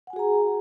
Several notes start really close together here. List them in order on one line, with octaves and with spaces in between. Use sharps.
F#5 G#5 F#4 G#4 A#5